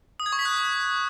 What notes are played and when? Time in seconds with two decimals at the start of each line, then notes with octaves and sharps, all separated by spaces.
0.20 D#6
0.26 G#6
0.32 C#6
0.39 B6
0.45 F#6